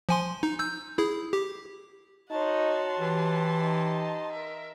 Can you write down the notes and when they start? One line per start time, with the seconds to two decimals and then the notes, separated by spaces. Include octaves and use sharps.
0.09 F3 G#5 C6
0.43 D#4
0.59 E6 G6
0.98 E4 G#4
1.33 G4
2.31 D#4 F#4 C#5 A5 C6
2.99 E3 G4
3.61 D#4
4.32 A#4 E5